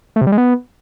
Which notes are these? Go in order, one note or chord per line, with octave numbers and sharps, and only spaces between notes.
A3
C3
G3
G#3
B3